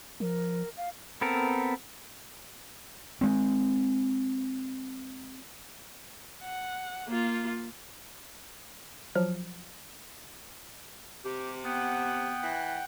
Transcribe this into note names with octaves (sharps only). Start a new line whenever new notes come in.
F3 A#4
F5
B3 C4 A4 A#4
G#3 C4
F#5
A#3 F4
F3 F#3 F6
C3 G4
B3 F#5 G5
E3